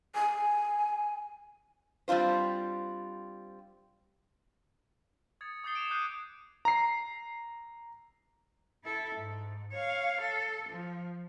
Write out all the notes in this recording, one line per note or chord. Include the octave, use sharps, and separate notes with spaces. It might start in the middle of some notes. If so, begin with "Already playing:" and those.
G#5
G3 C4 D4 F4 C5
D#6 G#6 A6 C#7
D6 D#6 G6 A6 C7 G7
D7 E7 F7
D6 D#6 F#6 G6 C7 D#7
A#5 C7
E4 A4
G#2
C#5 F5
A4
F3